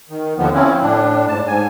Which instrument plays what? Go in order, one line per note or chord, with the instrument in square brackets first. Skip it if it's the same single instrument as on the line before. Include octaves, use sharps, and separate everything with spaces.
[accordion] D#3
D#2 D3 F3 B3
F3 C4 C#4 E4
A2 D4
G#2 A5
G#2 G#5